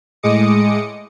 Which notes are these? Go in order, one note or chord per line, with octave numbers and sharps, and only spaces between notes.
A2 G#3 D#5 D6 D#6 C#7